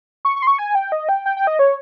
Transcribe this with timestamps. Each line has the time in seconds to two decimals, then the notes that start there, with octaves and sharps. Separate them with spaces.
0.25 C#6
0.36 C#6
0.42 C6
0.47 C#6
0.58 G#5
0.75 G5
0.92 D#5
1.09 G5
1.26 G5
1.37 G5
1.47 D#5
1.59 C#5